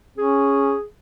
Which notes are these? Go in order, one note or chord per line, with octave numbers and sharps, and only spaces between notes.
C#4 G#4